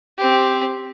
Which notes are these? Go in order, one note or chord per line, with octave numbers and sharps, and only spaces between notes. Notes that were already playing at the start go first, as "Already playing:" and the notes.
C4 G4